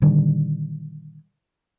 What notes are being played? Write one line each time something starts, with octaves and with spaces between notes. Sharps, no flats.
A#2 D3 D#3 G3